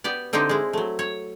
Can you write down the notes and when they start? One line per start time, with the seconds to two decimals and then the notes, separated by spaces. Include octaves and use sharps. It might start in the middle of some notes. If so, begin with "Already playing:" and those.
0.04 B3 G4 D5
0.33 D3 C4 D#4 E4 G4
0.49 G#3 E4
0.73 F#3 A3
0.99 C#5